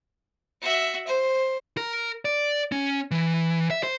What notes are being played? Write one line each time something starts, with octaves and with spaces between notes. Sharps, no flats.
F#4 E5
C5
A#4
D5
C#4
E3
E5
C5